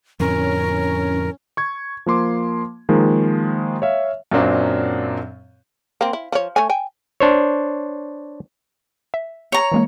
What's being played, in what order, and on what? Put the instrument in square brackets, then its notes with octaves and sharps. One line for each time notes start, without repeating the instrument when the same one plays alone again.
[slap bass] F2 A2 D3 [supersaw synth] C#4 [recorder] A#4
[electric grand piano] C#6 G#6
F3 A#3 C6 D6
D#3 F3 G#3 A#3
C#5 E5 F5
[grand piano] F#2 A#2 F#3 A#3 C4 D4
[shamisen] A#3 C4
E4
F3 C#5
A3 C#5 G#5
G5 G#5
[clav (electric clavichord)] D4 C5 C#5
[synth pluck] E5
[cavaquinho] C#5 A#5
[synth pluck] E3 G#3 A#3